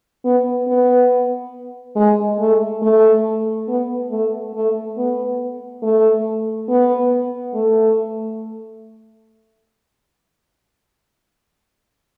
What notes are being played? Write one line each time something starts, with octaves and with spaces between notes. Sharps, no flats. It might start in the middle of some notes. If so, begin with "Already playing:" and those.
B3
B3
G#3
A3
A3
B3
A3
A3
B3
A3
B3
A3